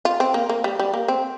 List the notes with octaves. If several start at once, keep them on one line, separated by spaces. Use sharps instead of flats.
F4
C4
A#3
A#3
G3
G3
A#3
C4